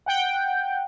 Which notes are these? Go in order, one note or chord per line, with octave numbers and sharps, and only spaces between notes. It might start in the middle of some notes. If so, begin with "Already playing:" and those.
F#5 G5